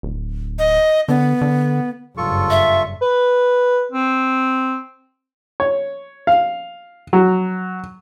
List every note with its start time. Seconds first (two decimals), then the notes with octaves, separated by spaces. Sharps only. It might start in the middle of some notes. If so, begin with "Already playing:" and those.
0.03 D1
0.59 D#5
1.08 D3 B3
1.41 D3
2.17 F#1 G2 F4 A4 C#6
2.50 E5
3.02 B4
3.92 C4
5.60 C#5
6.27 F5
7.13 F#3